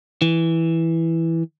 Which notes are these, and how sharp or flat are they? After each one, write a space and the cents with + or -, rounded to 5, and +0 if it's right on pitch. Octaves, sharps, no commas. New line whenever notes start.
E3 -5